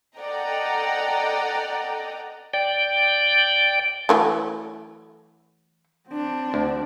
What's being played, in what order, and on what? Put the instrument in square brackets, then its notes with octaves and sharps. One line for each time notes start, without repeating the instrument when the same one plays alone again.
[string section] A4 D5 D#5 F#5 G5 A#5
[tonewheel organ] D5 G5
[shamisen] E3 F#3 A3
[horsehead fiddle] C4 D4
[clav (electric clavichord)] D2